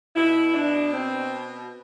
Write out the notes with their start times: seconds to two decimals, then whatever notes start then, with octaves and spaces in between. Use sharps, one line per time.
0.15 B2 E4
0.54 D4
0.93 C4